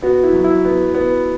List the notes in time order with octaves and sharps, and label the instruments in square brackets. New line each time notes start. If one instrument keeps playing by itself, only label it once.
[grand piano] B3 [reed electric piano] F#4
[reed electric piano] E4
[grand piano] F#3
[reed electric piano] E4
[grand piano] B3
B3